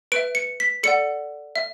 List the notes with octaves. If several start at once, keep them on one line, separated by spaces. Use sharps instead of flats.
B4 E5 D7
C#7
B6
A4 D5 F#5 C#7
E5